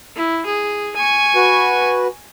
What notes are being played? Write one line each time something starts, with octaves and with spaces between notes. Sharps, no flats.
E4
G#4
G#5 C#6
F#4 B4